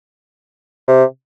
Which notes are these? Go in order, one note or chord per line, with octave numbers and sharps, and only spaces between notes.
C3